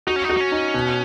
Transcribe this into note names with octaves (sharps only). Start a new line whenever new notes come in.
D#4 F#4
C#4
D#4
F#4
D#4
C#4
D#4
B2